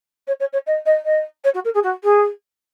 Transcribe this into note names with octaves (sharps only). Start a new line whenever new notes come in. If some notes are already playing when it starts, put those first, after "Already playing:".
C#5
C#5
C#5
D#5
D#5
D#5
C#5
F#4
A#4
G#4
F#4
G#4